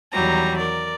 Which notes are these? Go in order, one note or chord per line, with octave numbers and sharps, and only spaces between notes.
E2 D#3 F#3 G3 A#5
A#4 D5